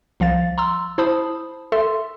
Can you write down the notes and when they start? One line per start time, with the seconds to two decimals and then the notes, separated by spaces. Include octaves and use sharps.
0.20 C2 F3 F5 A6
0.58 A#5 C6 E6
0.98 E4 C5 A5 B5 D#6
1.72 A4 E5 C6